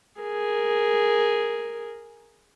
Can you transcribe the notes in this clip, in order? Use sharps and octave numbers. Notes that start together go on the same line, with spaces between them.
G#4 A#4